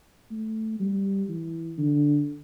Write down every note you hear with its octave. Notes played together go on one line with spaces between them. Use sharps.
A3
G3
E3
D3